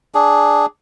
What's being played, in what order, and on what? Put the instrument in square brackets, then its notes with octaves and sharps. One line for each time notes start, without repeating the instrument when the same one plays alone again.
[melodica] D4 G#4